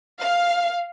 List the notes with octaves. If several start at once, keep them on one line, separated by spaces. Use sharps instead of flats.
F5